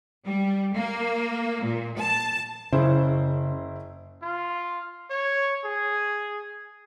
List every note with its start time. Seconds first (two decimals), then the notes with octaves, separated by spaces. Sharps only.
0.25 G3
0.76 A#3
1.65 A#2
2.00 A5
2.73 F#1 C#3 E4 C5
4.23 F4
5.11 C#5
5.65 G#4